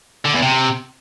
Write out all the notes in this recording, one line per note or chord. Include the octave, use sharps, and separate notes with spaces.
D3
E2
C3